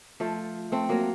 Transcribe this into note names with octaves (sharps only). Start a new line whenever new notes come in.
F3 A3
A3 C4
F#3 A#3